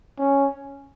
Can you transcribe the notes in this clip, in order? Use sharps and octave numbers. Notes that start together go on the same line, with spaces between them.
C#4